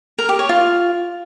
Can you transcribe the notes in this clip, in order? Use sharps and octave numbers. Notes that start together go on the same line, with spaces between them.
A#4
G4
C#5
F4